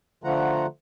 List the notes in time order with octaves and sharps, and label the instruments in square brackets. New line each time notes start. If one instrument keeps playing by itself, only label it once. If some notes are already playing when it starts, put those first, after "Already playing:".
[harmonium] D3 F3 A3 F4 F#5 A#5